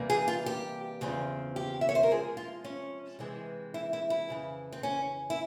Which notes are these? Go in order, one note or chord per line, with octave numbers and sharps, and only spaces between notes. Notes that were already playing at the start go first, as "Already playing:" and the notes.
Already playing: C3 E3 G3 A#3
G#4
F4
G4
E2 C#3 F3 C4
G4
E5
C#5
C5
A#4
C3 F3 G#3 G#4
F4
C#4
C3 E3 G#3 C4
E4
E4
E4
F2 C#3 E3
C4
C#4
E4